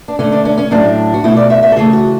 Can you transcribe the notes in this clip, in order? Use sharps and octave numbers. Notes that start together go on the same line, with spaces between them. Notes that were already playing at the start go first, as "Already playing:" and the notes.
D4
D3 A3 C#4
D4
C#4
C#4
A2 F#3 A3 D4
F#4
B2 A3 E4
D5
E5
E5
A4
C#3 E3 A3 G#4
F#4